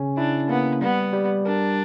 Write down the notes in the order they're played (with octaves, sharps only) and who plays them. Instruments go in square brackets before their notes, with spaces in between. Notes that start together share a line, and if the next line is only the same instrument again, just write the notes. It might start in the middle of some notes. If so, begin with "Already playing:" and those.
Already playing: [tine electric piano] C#3 C#4
[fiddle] D4 [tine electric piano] E4
[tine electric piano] A#3 [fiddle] B3
[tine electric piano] G3 [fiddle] B3
[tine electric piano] G3
[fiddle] D4 [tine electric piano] A#4